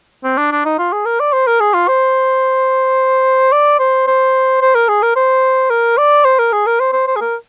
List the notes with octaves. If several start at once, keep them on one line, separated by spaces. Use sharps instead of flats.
C4
D4
D4
D#4
F4
G#4
A#4
D5
C5
A#4
G#4
F4
C5
D5
C5
C5
C5
A#4
G#4
A#4
C5
A#4
D5
C5
A#4
G#4
A#4
C5
C5
C5
G#4
A#4